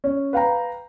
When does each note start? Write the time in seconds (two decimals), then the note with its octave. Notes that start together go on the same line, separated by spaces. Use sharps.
0.04 C#4
0.33 B4 F5 G5 A#5